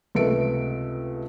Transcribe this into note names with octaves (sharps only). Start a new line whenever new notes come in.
C#2 C3 A3 B4 D7